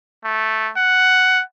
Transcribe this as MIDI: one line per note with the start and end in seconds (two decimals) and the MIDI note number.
0.25 0.71 57
0.77 1.42 78